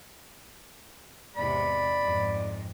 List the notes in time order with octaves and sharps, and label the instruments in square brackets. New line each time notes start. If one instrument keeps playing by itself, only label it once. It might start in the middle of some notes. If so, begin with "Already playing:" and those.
[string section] E2 G#2 C3 [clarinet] D5 [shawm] B5
[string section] F2 G#2